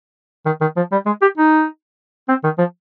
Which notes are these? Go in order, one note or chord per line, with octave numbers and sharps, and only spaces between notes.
D#3
D#3
F3
G3
G#3
G4
D#4
C4
D#3
F3